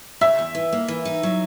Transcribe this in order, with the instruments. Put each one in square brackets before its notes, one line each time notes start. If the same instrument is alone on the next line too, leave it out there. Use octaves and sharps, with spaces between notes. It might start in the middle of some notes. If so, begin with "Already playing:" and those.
[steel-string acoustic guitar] C#3 [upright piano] E5
[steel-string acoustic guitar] E2
E3
A#3
E3
D#4
F#3